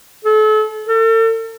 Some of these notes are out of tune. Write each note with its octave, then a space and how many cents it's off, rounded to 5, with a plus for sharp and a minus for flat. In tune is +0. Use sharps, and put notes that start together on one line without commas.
A4 -35
A4 +40